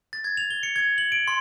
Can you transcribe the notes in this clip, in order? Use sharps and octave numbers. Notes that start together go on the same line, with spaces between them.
A6
G#6
F7
G7
C#7
G#6
F#7
D7
C6